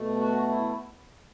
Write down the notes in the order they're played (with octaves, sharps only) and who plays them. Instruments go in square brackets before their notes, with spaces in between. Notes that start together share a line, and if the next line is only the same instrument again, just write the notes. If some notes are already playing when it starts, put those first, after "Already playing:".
Already playing: [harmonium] B2 A3
F#4
E4